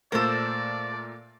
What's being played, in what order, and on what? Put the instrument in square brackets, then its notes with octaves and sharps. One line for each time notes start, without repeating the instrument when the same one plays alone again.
[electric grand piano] A#2 A3 A#4 [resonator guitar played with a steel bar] A4 C5 [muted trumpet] D5